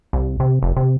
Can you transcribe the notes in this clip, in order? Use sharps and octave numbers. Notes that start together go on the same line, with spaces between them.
C2
C3
F1
C3